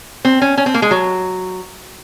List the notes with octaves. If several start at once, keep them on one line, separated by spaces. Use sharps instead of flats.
C4
C#4
C#4
C4
A#3
G#3
F#3